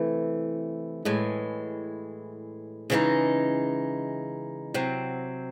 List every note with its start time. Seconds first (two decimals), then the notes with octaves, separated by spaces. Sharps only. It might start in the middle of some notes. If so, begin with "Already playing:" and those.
Already playing: C3 E3 A3
1.05 A2 E3 G#3
2.90 C#3 E3 G#3 D#4
4.74 C3 F#3 C4